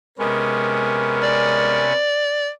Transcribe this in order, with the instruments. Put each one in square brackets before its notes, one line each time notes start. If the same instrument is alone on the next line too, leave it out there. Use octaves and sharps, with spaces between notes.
[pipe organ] C3 B3 C#4 [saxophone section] G#3 A#4
[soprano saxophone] D5